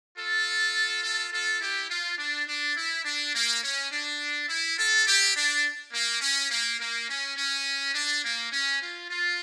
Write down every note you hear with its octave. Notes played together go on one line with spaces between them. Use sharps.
F4 A4
F4 A4
F4 A4
E4 G4
F4
D4
D4
E4
D4
A#3
C#4
D4
E4
F4 A4
E4 G4
D4
A#3
C#4
A#3
A#3
C#4
C#4
D4
A#3
C#4
F4
F4